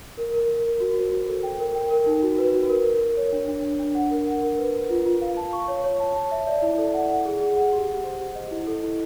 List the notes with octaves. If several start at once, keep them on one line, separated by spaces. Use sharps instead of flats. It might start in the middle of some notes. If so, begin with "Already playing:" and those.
A#4
A#4
A#4
A#4
F#4
C5
F#4
A4
G5
A#4
G5
A#4
D#4
F#4
B4
F#4
A#4
A#4
A#4
C#5
D4
D4
D4
D4
F#5
A#4
F#5
A#4
B4
B4
F4
F4
F5
A5
C#6
C#5
C#5
A5
A5
E5
D5
E4
A4
F#5
F#5
G#4
G#4
F#5
G4
G4
C5
G4
D#5
E4
A4
E4